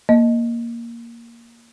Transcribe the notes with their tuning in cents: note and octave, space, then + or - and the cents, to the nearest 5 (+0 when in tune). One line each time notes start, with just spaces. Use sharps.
A#3 +0 D#5 +0